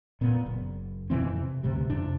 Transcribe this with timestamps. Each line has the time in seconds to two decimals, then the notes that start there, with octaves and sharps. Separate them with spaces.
0.21 A#2 B3
0.46 F#1
1.10 F2 B2 E3 C4
1.36 C3
1.63 D2 G2 C3 G3
1.90 F2 C3 D4